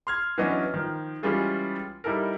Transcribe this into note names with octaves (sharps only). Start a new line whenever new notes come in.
C6 F6 G#6
E3 F#3 B3 C#4 D4 D#5
D#3 F3
E3 G3 G#3 C#4 F4 G#4
G3 D#4 E4 A4 A#4